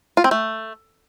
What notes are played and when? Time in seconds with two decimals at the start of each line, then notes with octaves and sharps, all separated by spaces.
0.17 F4
0.24 C4
0.31 A3